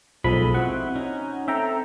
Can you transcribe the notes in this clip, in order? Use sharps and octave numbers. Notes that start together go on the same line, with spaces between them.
B1 F3 G#3 A4 D#5 B5
C4 E4 F#4 F#5
C#4 D#4
C4 A4 E5 G5 A#5